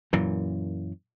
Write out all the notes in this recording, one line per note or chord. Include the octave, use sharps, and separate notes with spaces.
F#2 A#2 E3